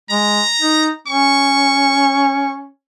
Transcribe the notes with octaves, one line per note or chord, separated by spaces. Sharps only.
G#3 A#5
D#4
C#4 C#6